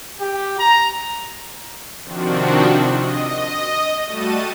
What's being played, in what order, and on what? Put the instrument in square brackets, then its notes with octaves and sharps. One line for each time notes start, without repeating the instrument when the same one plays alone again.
[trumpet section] G4
A#5
[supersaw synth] C3 D#3 F3 C4 D4 F#4
D#5
G3 A3 F#4 A5 D#7